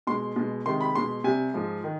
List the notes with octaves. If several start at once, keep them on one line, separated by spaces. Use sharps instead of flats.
B2 G#3 C6
B2 G#3
C3 D#3 G#3 C6
B5
B2 G#3 C6
C3 G3 G#5
G#2 F3 G#3
D#3